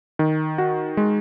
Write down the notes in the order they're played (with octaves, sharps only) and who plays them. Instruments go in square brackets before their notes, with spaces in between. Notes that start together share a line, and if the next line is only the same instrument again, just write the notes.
[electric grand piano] D#3
F#4
G#3